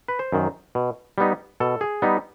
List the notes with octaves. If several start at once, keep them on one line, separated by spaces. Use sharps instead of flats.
B4
C5
F#2 D#3
B2
G3 B3 D#4
B2 A4
G#4
G3 B3 D#4